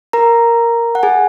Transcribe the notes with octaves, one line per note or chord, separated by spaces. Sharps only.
A#4 A#5
F#5
G#4 G#5